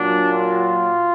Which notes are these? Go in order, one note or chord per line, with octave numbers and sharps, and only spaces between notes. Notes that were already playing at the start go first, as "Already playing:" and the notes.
Already playing: A#2 F#3 D4
F4